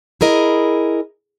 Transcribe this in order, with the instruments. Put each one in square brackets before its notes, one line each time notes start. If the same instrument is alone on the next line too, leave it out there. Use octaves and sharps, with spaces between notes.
[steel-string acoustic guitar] E4 G#4 A#4 D#5